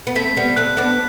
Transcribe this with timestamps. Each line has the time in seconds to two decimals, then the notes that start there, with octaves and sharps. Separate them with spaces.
0.07 B3
0.15 A3 C4 B6
0.37 G3 B3
0.56 A3 C4 F#6
0.77 B3 D4